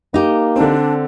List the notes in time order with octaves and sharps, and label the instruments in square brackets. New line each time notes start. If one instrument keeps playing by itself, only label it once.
[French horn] A#3 [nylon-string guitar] D#4 G4
[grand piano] D3 C4 [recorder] D4